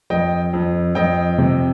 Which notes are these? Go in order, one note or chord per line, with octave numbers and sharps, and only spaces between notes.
F2 D#5 G5
F2
F2 D#5 G5
C3